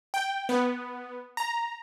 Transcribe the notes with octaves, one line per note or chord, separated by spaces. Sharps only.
G5
B3
A#5